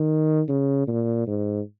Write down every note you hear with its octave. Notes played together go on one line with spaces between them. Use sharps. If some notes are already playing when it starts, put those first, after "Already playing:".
Already playing: D#3
C#3
A#2
G#2